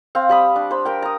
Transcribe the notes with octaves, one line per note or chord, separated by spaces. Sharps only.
C4 F5
G3 B5 D#6
D4
C5 B5
A#4 G5
A#5 D#6